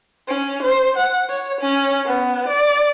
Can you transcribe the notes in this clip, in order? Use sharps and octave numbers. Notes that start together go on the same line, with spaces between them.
C#4
C5
F#5
C#5
C#4
B3
D5